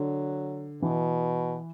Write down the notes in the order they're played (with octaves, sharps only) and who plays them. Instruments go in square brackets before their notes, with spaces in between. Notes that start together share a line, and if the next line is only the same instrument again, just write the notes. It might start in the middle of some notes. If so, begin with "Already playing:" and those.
Already playing: [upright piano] D3 [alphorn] F#3
[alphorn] B2 [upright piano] E3